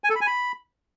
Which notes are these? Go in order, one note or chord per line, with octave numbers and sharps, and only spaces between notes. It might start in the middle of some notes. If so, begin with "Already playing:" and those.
G#5
A4
B5
G#5
B5